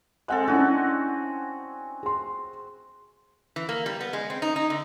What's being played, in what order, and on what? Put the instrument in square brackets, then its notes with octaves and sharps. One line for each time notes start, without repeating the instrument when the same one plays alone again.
[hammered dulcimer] G#3 C4 A4 [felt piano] F#5 F#6
[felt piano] C#4 D4 E4 [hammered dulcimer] F#4 G#5
[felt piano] G#4 C6
[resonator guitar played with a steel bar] E3
A#3
G3
B3
G#3
C4
D#4
D#4
D3